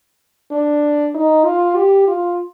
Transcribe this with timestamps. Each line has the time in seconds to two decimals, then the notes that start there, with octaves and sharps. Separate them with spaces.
0.52 D4
1.15 D#4
1.45 F4
1.76 G4
2.08 F4